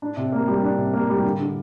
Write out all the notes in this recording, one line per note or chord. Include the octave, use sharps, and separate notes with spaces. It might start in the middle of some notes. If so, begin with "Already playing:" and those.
D4
C3
A#3
G3
D4
C3
A#3
G3
D3
D3